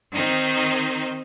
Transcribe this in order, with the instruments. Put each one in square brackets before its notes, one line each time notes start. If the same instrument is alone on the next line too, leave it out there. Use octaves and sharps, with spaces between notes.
[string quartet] D#3 C4 D#4